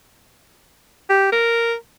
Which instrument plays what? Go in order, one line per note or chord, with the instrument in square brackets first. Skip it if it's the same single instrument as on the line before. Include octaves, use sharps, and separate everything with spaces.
[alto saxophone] G4
A#4